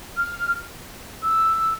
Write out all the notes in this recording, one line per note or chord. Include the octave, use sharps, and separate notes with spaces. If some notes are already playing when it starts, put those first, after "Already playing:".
F6
E6